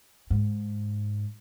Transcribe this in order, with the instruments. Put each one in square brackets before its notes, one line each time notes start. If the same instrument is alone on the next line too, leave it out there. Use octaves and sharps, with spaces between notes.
[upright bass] G#2